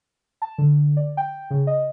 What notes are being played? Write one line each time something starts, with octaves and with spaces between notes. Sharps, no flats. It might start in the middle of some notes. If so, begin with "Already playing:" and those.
A5
D3
D5
G5
C#3
D#5